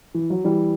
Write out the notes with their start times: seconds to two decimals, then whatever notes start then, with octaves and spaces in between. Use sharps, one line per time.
0.14 E3
0.30 F#3
0.44 E3 G3